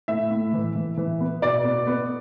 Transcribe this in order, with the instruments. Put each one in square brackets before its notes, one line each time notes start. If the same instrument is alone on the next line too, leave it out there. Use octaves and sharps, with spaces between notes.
[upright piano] A2 E5
A2
E3
E3
E3
B3
B2 D5
B3
B3